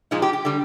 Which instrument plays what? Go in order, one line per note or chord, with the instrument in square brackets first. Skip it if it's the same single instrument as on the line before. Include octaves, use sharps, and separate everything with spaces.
[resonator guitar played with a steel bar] A#2 F3 G#3 D#4
G4
G4
D3 G3